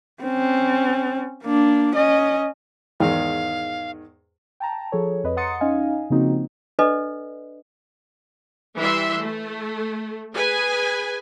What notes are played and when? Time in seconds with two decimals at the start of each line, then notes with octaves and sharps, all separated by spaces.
0.23 C4 C#4
1.43 A#3 D4
1.96 C#4 D#5
3.00 E2 G#2 D#3 F5
4.60 G5 A5 A#5
4.92 F3 G#4 A4 C#5
5.24 F2 B4 D#5
5.37 F#5 A#5 C6 D#6 A6 C#7
5.61 C#4 D#4 D#5 F5 G#5
6.10 C#3 F3 A#3 C4 D#4 F#4
6.79 D4 A4 B4 D5 D#5
8.77 E3 G3 E5 C6
9.19 A3
10.34 G#4 B4 G#5